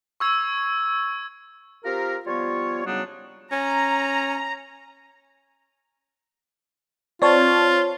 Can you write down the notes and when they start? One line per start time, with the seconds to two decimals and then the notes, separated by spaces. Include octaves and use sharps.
0.20 C#6 E6 G#6
1.85 C4 F4 G4 A#4
2.26 F3 G3 B3 F4 C#5
2.86 C#3 F#3 G3 B3 D4 D#4
3.52 C#4 A#5
7.22 C4 F4 C#5 D5 A5